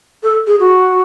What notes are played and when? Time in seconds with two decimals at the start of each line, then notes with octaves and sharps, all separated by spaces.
0.23 A4
0.47 G#4
0.60 F#4